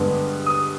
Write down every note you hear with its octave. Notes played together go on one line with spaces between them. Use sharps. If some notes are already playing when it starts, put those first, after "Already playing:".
Already playing: G2 D3 G#3 B3
D#6